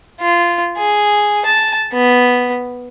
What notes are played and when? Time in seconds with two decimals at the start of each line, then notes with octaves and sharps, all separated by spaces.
0.21 F4
0.78 G#4
1.45 A5
1.93 B3